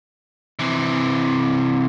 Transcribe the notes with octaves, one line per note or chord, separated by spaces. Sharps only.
C3 E3